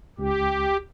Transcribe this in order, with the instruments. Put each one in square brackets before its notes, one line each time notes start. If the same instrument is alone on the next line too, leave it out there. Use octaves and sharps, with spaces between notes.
[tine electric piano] C#2 [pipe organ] G4